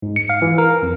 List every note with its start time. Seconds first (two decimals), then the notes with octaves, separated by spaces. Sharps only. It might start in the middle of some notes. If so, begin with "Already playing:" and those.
0.02 G#2
0.16 C#7
0.29 F5
0.42 E3
0.58 A#4
0.82 F2